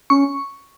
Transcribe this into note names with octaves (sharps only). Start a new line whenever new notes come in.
C#4 C#6